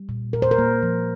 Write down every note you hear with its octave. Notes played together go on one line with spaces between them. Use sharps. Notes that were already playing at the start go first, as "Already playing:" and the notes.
Already playing: G3
A#2
A#2 A#4
C5
A#4
A#3
F3